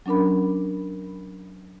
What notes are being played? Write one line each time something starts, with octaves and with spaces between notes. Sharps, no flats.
F#3 C#4 D4 A#4 B5